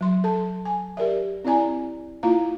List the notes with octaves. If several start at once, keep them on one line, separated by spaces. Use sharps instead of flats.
F#3 C6
A4 A5
G#5
G4 A#4 D5 E5
C4 E4 D5 G#5 A#5
A#3 E4 F4 F5 A#5